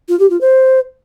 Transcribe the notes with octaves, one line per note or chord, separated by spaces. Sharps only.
F4
G4
F4
C5